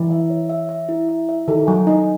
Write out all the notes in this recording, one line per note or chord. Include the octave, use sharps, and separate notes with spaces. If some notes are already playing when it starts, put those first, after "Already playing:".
Already playing: E3 E4
E5
C#5
E5
E5
E4
E5
E5
D#3 A4
F#3 G#5
D#4 D#5